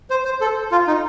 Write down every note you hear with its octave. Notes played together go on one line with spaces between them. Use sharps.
C5
C5
A4
F4
D#4